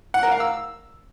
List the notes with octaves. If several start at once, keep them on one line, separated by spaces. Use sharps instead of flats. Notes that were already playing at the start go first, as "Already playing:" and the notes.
F#5
A#4
F5
E6